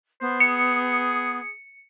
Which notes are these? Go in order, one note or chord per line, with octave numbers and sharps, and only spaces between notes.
B3 C5
G#4 C#7